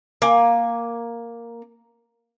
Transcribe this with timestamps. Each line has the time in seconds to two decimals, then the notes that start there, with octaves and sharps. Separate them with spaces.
0.22 A#3 G#5